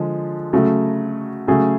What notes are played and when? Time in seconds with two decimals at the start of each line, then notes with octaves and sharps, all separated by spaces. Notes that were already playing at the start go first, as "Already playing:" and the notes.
Already playing: D3 F3 G#3
0.53 C#3 F#3 A3
1.48 C#3 F#3 A3 G#4